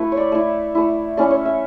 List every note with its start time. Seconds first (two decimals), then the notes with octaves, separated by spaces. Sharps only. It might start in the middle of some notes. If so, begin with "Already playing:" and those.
Already playing: A3 E4 B4
0.12 C#5
0.17 D5
0.32 A3 E4
0.75 A3 E4
1.17 A3 C#4 E4 D5
1.31 C#5
1.45 E5